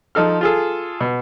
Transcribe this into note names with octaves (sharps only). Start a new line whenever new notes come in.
F3 D#4 A4 F6
F4 G#4 A4
B2